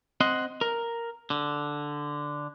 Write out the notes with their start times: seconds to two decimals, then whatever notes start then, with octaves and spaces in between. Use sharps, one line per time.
0.20 C4 D#5 F#5 C6
0.61 A#4
1.30 D3